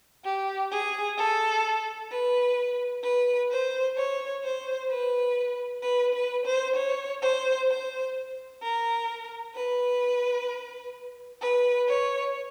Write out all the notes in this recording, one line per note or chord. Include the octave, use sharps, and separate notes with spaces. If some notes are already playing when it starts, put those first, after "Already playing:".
G4
G#4
A4
B4
B4
C5
C#5
C5
B4
B4
B4
C5
C#5
C5
C5
A#4
B4
B4
C#5